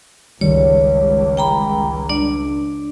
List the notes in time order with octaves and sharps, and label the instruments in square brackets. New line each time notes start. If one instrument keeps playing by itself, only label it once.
[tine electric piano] G1 D#3 G3 [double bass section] C#2 [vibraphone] C#5
[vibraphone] G5 A#5 B5
D4 D5